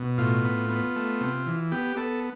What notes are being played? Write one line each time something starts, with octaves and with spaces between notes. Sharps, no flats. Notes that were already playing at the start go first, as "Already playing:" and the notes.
Already playing: B2
A2 F4
B3
B3
A3
C3
E3
B3 G4
B3 A4